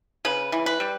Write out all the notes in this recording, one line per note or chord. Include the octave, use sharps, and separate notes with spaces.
C#3 B4
E3
B4
G3